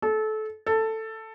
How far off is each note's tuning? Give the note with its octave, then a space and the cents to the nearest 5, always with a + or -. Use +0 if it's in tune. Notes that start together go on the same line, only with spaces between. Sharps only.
A4 -25
A4 +10